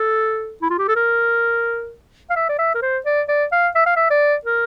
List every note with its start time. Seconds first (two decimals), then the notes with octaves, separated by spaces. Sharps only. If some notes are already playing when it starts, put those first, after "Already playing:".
Already playing: A4
0.62 E4
0.70 F4
0.79 G4
0.88 A4
0.96 A#4
2.30 F5
2.36 E5
2.49 D5
2.59 E5
2.75 A#4
2.82 C5
3.06 D5
3.29 D5
3.52 F5
3.75 E5
3.86 F5
3.96 E5
4.10 D5
4.45 A#4